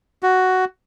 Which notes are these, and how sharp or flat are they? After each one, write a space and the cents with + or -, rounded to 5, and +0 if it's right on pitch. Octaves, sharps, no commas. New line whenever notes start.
F#4 +5